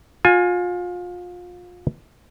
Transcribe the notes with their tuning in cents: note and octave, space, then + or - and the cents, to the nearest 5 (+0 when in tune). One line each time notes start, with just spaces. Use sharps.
F4 +30 G#5 +0